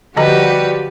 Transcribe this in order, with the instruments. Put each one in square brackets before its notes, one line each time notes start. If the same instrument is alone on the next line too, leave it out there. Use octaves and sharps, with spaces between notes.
[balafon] D3 D#5 A#5 [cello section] F3 G4 [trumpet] G3 [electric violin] F#4 B4